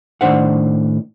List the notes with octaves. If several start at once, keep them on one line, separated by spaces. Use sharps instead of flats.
A2 D#3 F#3 D4 C5 F#5